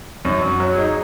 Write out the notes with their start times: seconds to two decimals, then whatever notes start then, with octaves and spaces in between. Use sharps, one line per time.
0.24 F#2 D#4
0.42 F#2
0.49 F#4
0.60 F#3
0.72 G#4
0.78 D#4